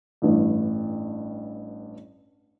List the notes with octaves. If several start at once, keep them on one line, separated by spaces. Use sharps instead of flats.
A1 G2